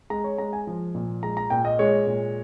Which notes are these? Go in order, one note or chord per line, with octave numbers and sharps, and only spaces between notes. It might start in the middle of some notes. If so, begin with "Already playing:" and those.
G#3 A#5
C#5
G#3 A#5
G#5
F3
A#2
G#3 A#5
A#5
A#2 G5
D#5
G#3 C#5
A#2